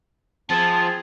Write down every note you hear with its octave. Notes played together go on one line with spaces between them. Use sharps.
F3 C4 G#4 A5 A6